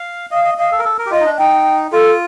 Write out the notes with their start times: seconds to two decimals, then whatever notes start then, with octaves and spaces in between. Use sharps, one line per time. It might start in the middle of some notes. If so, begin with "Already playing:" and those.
Already playing: F5
0.31 D#5 F5
0.44 D#5
0.58 D#5 F5
0.71 A4
0.79 A#4
0.85 A4
0.99 A#4
1.06 G4
1.11 F4 D#5
1.20 D#4
1.26 D4
1.38 D#4 G5
1.92 F4 A4